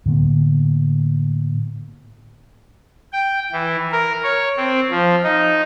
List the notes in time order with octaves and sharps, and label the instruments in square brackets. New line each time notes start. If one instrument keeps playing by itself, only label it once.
[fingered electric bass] A2 D3 A#3 B3
[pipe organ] G5
E3
A#4
C#5
C4
F3
D#4